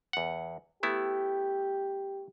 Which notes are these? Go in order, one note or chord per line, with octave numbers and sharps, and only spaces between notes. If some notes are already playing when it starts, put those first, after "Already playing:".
E2 F#5
A3 B3 E4 G4